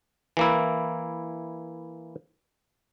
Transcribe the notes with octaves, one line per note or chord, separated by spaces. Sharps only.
E3 A#3 E4